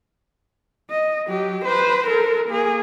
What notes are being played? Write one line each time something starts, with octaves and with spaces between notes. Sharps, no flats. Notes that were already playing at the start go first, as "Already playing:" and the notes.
D#5
F#3 G4
B4 C5
A4 A#4
A#3 G#4